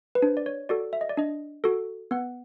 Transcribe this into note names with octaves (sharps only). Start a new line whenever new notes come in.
B4
D4 C5
D5
C#5
F#4 A4 D5
E5
D#5
D5
D4 D#5
F#4 A4
B3 F#5